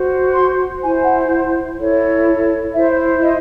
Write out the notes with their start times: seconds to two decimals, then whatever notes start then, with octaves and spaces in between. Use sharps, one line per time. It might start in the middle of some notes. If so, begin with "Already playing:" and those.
Already playing: F#4 C5
0.34 C6
0.82 E4 C5 G#5
1.06 F#5
1.78 E4 A4 C#5
2.73 E4 C5 E5
3.22 D#5